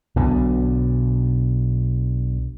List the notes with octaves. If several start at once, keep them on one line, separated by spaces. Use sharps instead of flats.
B1 B2 D3